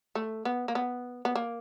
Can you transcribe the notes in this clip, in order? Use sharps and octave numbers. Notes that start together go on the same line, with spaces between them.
A3
B3
A#3
B3
B3
A#3